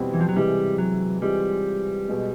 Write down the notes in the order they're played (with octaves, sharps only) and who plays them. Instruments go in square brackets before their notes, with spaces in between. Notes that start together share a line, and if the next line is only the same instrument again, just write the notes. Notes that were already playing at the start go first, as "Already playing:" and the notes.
Already playing: [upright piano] E2 B2 G3 C4
[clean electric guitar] E3
F3
F#3
[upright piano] C3 E3 G#3 [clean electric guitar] G3
[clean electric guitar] F#3
[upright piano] E3 G#3 C4 F4 G#4 [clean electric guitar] G3
[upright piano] B2 G#3